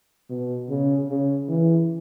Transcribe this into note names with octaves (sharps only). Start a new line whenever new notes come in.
B2
C#3
C#3
E3